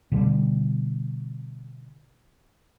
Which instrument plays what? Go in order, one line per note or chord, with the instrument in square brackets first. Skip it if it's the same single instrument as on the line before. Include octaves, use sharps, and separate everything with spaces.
[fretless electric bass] B2 D3 G3